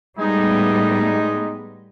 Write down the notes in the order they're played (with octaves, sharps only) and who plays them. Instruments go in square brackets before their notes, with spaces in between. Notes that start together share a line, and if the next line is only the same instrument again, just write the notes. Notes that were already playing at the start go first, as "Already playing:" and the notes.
[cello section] A2 G3 B3 [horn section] G#3 D#4